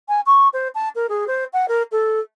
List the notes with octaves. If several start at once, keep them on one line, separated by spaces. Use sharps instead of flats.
G#5
C#6
C5
A5
A#4
G#4
C5
F#5
A#4
A4